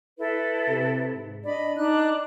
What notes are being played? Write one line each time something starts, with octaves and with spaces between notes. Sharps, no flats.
E4 A4 B4
C3
G#2
D4 D5 D#5 B5
D4 D#4 F#6